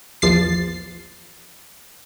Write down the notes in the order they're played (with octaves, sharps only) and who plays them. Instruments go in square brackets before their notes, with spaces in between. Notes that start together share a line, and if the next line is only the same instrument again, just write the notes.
[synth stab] A#1 E2 F3 A6 C7